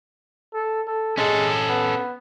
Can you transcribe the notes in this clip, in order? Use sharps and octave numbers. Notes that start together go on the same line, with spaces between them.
A4
A4
G#3 C#4 A4
B3